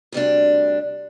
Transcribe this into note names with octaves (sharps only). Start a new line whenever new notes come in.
D2 C3 G3 D4